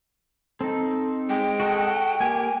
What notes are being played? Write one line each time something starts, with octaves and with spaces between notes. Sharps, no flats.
C4 D#4 A4
G#3 G5
F#4 A4 D#5
A#3 G4 G#5